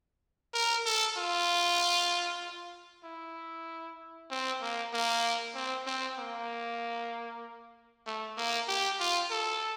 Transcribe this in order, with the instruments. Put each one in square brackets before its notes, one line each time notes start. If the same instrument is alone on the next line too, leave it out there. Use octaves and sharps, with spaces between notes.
[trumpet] A#4
A4
F4
E4
C4
A#3
A#3
C4
C4
A#3
A3
A#3
G4
F4
A4